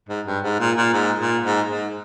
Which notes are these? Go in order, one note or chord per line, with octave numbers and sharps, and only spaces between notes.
G#2
G2
G#2
A#2
A#2
G#2
A#2
G#2
G#2